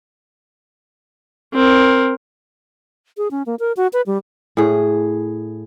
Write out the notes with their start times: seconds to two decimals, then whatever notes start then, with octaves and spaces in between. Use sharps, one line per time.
1.54 C4 A#4
3.17 G#4
3.31 C#4
3.46 A#3
3.60 A#4
3.77 F#4
3.93 B4
4.07 G3
4.57 A2 G#4